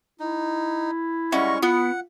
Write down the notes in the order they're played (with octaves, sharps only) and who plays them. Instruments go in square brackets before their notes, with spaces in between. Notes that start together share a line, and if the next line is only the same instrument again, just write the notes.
[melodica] D#4 [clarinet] E4
[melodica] G3 G#3 C#6 [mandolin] C#4 [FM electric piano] E5 F#5 A#6
[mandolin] B3 [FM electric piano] F4 [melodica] F#5